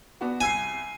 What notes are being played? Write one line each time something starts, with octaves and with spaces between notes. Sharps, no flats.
B3 D4 F#4
C2 G#5 E6 C7